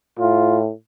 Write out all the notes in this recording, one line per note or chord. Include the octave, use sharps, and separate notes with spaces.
A2 F4